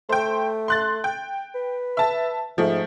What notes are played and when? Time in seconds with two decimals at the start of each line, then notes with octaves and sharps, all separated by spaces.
0.09 A3 C5 G5
0.68 C6 F#6 A6
1.04 G5
1.55 B4
1.97 E5 A5
2.58 G#2 F3 A3